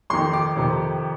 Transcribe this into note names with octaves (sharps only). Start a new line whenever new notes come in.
F2 D#3 C6
D6
F2 C3 D#3